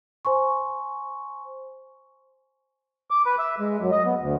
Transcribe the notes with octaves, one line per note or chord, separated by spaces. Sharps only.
C5 G#5 C6 C#6
D6
B4
E5
G#3
F#2
D#5
B3
D2